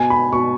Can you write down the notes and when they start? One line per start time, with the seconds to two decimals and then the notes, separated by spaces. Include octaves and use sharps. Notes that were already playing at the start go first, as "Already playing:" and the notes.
Already playing: B2 G#5
0.10 B5
0.32 B2 C#6